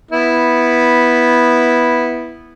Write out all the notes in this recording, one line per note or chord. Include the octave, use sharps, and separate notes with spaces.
B3 E4